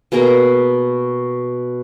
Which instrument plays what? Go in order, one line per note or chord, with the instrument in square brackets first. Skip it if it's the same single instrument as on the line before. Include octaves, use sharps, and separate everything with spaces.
[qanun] B2 A#3 G#4 A#5